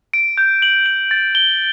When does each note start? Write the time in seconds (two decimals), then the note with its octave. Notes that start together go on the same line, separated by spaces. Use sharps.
0.13 D7
0.38 G6
0.62 F#7
0.86 F#7
1.11 A6
1.35 G7